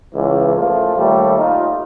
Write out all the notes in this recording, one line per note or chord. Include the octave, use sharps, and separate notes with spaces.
C#2 E3
A#2 F3 A3 F4
D#2 G3 A3
D#4 F4